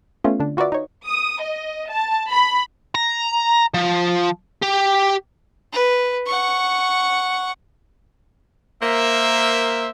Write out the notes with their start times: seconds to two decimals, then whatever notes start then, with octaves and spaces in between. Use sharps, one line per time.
0.24 A3 B3 C#4 F4
0.40 D3 D4
0.57 F4 F#4 A#4 B4 D5 E5
0.72 D#4 C#5
1.06 D#6
1.43 D#5
1.90 A5
2.30 B5
2.95 A#5
3.74 F3
4.62 G4
5.73 B4
6.26 F#5 C#6
8.82 A#3 A#4 C5 E5